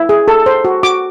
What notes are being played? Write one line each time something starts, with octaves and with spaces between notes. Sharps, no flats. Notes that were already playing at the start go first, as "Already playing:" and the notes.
Already playing: E4
G#4
A4
C5
F#4
F#4 D6